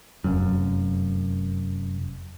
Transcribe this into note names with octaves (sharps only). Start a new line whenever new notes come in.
F1 F#2